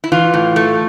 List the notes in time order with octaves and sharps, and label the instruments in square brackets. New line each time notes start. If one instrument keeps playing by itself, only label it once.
[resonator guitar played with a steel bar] E4
E3 F4
A2
A3